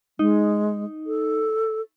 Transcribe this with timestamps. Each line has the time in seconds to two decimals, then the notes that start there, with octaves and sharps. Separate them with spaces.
0.19 G#3 D#4
1.06 A4